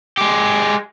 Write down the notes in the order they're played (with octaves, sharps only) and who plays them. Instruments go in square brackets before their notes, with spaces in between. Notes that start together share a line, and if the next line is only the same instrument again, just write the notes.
[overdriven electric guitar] G#3 G4